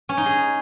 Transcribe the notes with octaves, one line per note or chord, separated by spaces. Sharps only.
C#4
D#4
G#4